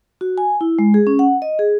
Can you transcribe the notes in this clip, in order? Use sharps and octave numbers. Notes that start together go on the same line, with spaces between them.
F#4
G#5
E4
G#3
G#4
C#4
F#5
D#5
G#4